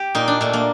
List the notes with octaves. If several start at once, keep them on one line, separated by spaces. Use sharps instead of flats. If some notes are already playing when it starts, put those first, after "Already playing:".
Already playing: G4
A#2 D#4
D4
A#2 A3
A#3